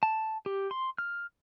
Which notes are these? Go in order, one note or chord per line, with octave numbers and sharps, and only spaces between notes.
A5
G4
C6
F6